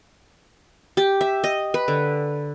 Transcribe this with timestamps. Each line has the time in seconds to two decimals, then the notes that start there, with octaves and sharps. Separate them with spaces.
0.97 G4
1.21 E5
1.44 D#5
1.74 B4
1.88 D3